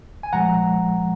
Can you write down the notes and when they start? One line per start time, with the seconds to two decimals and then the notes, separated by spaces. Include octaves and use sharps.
0.23 G#5
0.33 A#2 F3 G#3 F#5 A#5